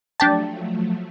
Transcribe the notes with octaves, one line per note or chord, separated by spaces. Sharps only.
F3 F#3 A3 D4 G4 A5